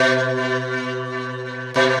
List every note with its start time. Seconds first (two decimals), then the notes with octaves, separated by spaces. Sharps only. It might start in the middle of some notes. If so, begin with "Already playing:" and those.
Already playing: B2
1.76 B2